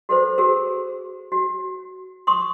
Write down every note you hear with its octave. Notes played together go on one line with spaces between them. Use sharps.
F#4 A4 B4 C5
F#4 G#4 A#4
F#4
C6 C#6 D#6